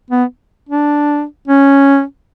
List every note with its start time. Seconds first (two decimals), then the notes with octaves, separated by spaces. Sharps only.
0.10 B3
0.69 D4
1.47 C#4